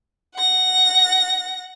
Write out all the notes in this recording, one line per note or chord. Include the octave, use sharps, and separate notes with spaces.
F#5 A#6